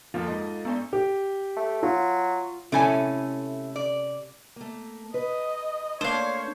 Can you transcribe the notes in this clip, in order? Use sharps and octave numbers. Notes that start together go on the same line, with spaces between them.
F2 F3 A#3 F4 A4
G#2 D#5 A5
B3 D4 D5
G4
A3
F#3 F4
C3 A3 C#4 E4 A4 G#5
D5
A3 A#3
B4 D#5
A3 A#3 D4 C5 C#5 F5